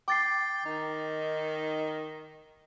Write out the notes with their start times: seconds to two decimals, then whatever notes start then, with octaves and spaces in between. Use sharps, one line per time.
0.08 G5 D6 A6 C7
0.65 D#3 D#4